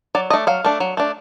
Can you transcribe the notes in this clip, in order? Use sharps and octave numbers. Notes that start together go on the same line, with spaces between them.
F#3 D5
A3 D4 D#5
F#3 F5
A3 D4
F#3
A3 D4